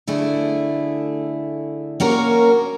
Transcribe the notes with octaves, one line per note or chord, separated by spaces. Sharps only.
D3 A3 E4 G#4
A#3 C#4 F#4 A#4